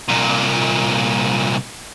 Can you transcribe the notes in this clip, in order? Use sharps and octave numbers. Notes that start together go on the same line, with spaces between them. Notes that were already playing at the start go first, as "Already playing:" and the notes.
C2 A#2